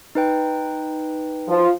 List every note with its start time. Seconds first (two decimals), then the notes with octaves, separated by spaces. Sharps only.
0.15 D#4 B4 G5
1.48 F3 F4